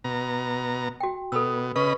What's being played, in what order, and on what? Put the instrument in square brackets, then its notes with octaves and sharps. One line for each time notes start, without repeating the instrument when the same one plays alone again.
[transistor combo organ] B2 A#5
[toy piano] F#4 G5
[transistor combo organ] B2 [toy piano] A4 B5 E6
[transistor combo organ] C#3 D#5 B5 [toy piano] B4 C#6